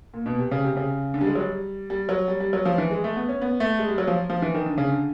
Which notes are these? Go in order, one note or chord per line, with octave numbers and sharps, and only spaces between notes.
A#2
B2
C3
C#3
C3
C#3
D3
G3
G#3
F#3
G3
G3
F#3
G3
G3
F#3
F3
E3
G#3
A3
B3
C#4
B3
A3
G#3
G3
F#3
F3
F3
E3
D#3
D3
C#3
D3